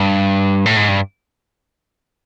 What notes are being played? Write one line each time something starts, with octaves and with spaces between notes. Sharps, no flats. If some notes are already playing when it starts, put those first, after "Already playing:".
Already playing: G2
A2
G#2
G2